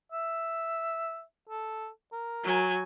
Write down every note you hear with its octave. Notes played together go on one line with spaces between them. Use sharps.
E5
A4
A#4
F#3 G#5